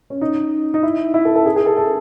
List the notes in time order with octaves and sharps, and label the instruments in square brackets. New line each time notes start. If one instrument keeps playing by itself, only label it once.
[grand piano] C#4
D#4
D#4
E4
E4
A4
A4
G#4
G#4
A4
A4